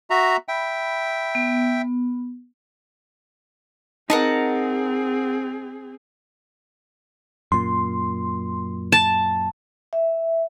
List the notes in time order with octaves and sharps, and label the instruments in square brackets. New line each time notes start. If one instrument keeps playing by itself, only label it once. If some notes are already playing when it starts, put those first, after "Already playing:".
[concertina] F#4 E5 A#5
[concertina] E5 G5 [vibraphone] B5
[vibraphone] B3
[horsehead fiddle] C4 G#4 [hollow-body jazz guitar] D#4 [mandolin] A#4 F#5 A5
[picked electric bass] F#2 A#2 [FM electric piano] C6
[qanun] A5
[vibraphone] E5